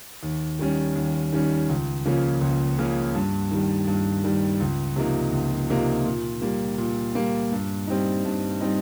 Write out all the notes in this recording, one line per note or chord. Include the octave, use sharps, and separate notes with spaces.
D#2
D#3 G3 C#4
D#2
D#3 G3 C#4
C#2
C#3 F3 A#3 C#4
C#2
C#3 F3 A#3 C#4
G2
D#3 G3
G2
D#3 G3
C#2
C3 F3 A#3 D#4
C#2
C3 F3 A#3 D#4
A#2
G3 A#3
A#2
G3 A#3
G2
G3 C4 D#4
G2
G3 C4 D#4